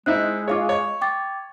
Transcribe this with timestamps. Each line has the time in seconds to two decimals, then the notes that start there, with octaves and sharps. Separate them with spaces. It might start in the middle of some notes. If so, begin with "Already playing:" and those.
0.06 G#3 C4 D#4 E4 F#6
0.48 F4 G#4 C#5 F5 D6
0.69 C#5
1.01 G5 D6 A6